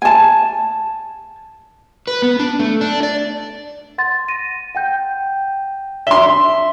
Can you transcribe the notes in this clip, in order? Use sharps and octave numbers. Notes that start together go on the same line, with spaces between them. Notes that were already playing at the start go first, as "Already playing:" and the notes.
G#5 A5
B4
B3
D4
A3
D4
D5
F#5 C6 A6
A#6 D#7
F#5 G5 G6
D4 E5 C6 G7